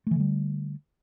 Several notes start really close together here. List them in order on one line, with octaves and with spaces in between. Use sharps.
A3 E3 D3 G3